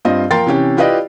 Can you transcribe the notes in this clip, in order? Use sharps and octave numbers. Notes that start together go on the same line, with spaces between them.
G2 C4 F4 D#5
F3 A#4 G5 C6 A6 C7
C3 E3 C#4 G4
E4 F4 G4 B4 D5 D#5